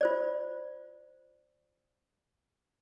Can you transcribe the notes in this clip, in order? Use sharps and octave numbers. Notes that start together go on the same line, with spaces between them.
F4 C5 D5